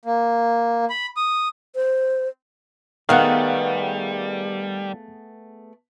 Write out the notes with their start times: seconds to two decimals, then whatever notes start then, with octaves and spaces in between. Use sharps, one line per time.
0.05 A#3
0.90 B5
1.17 D#6
1.75 C5
3.09 D#3 G3 A3 B3 G#4 F5 F#5